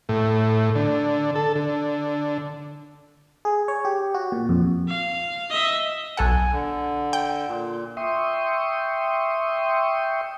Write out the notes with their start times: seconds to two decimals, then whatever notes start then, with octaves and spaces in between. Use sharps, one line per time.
0.09 A2
0.75 D3
1.35 A4
1.55 D3
3.45 G#4
3.68 C#5
3.85 G4
4.14 F#4
4.32 A#2
4.49 F2
4.88 F5
5.51 D#5 E5
6.17 B1 A4 F#5 G#5
6.52 D3
7.13 G5
7.48 A#2
7.97 E5 G5 C6 C#6 D#6